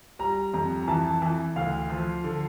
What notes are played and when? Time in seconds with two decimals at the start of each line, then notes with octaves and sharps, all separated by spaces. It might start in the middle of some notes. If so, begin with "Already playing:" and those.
0.19 G3 A#5
0.54 F2 A#5
0.82 A#5
0.88 E3 A5
1.22 E3
1.56 D2 F5
1.90 F3
2.24 D3